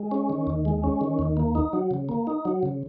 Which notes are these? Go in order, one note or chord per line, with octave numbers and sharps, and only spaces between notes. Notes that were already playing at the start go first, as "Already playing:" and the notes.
Already playing: G#3
C#4
D#3
D#2
G#3
C#4
D#3
D#2
A#3
D#4
F#3
C#3
A#3
D#4
F#3
C#3